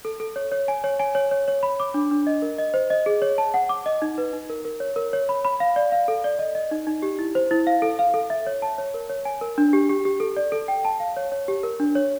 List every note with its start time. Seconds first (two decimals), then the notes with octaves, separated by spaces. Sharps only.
0.05 A4
0.20 A4
0.36 C#5
0.52 C#5
0.68 G#5
0.84 C#5
0.99 G#5
1.15 C#5
1.31 C#5
1.48 C#5
1.63 B5
1.80 D6
1.94 D4
2.11 D4
2.27 D#5
2.42 A#4
2.58 D#5
2.74 C5
2.90 D#5
3.06 G#4
3.22 C#5
3.38 A5
3.54 F#5
3.69 D6
3.86 D#5
4.02 D#4
4.18 B4
4.33 D#4
4.50 A#4
4.65 A#4
4.80 C#5
4.96 A#4
5.13 C#5
5.29 B5
5.45 B5
5.60 F5
5.76 D5
5.92 F5
6.08 A4
6.24 D5
6.39 D#5
6.55 D#5
6.71 D#4
6.87 D#4
7.02 G4
7.19 E4
7.35 C5
7.51 E4
7.67 F5
7.82 A4
7.99 F5
8.14 A4
8.30 E5
8.47 C#5
8.62 A5
8.78 C#5
8.94 A#4
9.09 C#5
9.25 G#5
9.41 A#4
9.58 D4
9.73 G4
9.89 G4
10.05 G4
10.20 A4
10.37 D5
10.52 A4
10.68 G5
10.85 A5
11.00 F5
11.16 C#5
11.32 C#5
11.48 G4
11.63 A#4
11.80 D4
11.95 C#5